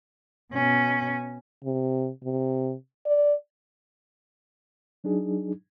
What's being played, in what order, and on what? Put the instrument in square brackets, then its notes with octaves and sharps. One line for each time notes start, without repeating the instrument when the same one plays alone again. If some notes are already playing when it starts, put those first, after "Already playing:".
[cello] B2 C#4
[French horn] C3
C3
D5
[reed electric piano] F#3 D4 D#4 G#4